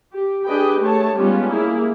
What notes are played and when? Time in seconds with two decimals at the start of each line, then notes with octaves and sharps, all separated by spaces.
0.14 G4
0.46 D4 G4 G#4 B4 D#5 G5
0.80 A3 G#4 C#5 A5
1.17 G3 G#3 B3 C#4 F4 G4
1.49 A#3 E4 G#4